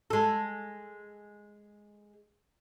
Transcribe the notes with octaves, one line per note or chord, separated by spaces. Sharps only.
G#3 A4